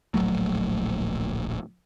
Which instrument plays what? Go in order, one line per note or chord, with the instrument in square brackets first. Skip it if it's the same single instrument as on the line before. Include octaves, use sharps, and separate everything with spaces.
[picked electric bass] D1 A#1 F#3 A3